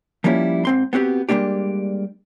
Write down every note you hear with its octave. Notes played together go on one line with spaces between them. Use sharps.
F3 G3 A#3 C#4 E4
G#2 C4 C6
B3 C4 F#4 G4
G3 G#3 A#3 D4 G4